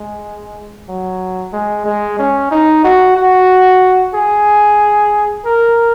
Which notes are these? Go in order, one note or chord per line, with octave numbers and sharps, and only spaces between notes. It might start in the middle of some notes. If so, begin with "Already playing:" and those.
Already playing: G#3
F#3
G#3
G#3
C#4
D#4
F#4
F#4
G#4
A#4